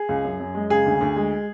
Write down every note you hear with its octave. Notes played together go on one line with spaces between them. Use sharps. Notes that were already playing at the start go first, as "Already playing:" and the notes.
Already playing: G#4
C#2
F#2
F#2
G#3
C#3 G#4
D2
D2
G#3